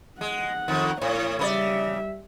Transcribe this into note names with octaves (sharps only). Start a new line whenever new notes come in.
G#3 F#5
F2 D#3
A2 C#5
C#3 G3 A#4 D5 E5